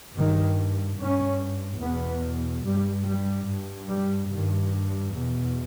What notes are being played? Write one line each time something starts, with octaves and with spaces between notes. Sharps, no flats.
G2 D#3
G2 C#4
E2 B2 B3
G2 G3
G3
G2
G3
G2 D#3
E2 B2